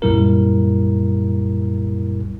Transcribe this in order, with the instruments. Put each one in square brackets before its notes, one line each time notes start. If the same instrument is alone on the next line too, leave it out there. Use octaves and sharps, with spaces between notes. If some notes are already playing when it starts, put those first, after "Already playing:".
[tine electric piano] C2 F#2 A#2 G3 E4 A#4